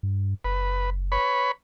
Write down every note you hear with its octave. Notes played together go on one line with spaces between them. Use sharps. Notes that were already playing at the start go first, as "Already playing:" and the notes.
G2
F#1 B4
B4 C#5 B5